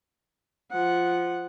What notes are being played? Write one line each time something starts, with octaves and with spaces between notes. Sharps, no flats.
F3 F#5